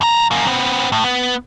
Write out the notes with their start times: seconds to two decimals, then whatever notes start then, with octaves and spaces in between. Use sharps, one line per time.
0.01 F2 A#5
0.31 F#2 A#3
0.47 B3 C4
0.92 A2
1.04 B3